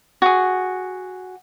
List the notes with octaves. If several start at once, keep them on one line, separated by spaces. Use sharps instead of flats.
F#4 G#4